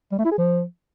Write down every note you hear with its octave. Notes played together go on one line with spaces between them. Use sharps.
G3
A3
E4
G#4
F3